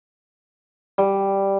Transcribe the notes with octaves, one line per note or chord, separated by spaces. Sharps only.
G3